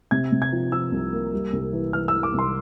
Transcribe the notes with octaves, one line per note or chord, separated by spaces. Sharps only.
C3 G#6
C3
G#6
F3
F3 E6
C2
A#3
G3
C2
E3
E3 F6
E6
E3
D6
C2 C6